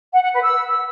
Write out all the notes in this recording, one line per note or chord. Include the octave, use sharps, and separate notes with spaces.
F#5
F#5
B4
E6